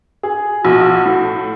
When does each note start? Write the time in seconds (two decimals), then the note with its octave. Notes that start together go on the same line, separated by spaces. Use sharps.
0.23 G#4
0.64 A#1 B2 F#4
1.06 A2